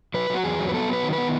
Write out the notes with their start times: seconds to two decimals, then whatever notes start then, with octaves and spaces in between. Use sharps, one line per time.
0.14 F#3 B4
0.30 F#3 F#4
0.44 E2 G#4
0.59 F#3
0.69 B4
0.74 B3 A4
0.89 F#3 B4
1.03 D#3
1.13 B3 B4